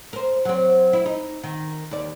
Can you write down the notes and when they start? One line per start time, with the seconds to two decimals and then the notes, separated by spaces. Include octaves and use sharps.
0.13 A#4 C5
0.45 F#3 C4
0.93 E4
1.06 D#4
1.43 D#3
1.91 D#2 D5